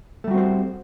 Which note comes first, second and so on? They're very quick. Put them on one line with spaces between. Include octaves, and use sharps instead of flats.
A3 G3 F#4 C4 C5